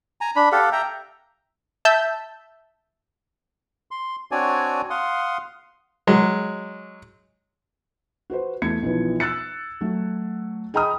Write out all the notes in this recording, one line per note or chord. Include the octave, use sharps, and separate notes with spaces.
G#5 A#5
D4 B5
G4 A4 F5 F#5
E5 G5 A#5
E5 A5 E6 G6
C6
C4 D4 F#4 C#5 D5 G#5
F5 F#5 C6 D#6
F#3 G#3
F#4 B4 C5
E2 A3 G#6 C#7
B1 E3 F3 B4
E6 F#6 A6 C#7
F#3 A3
G#4 D#5 G5 A#5 B5 D#6